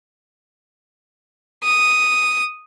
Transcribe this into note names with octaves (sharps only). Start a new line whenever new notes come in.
D#6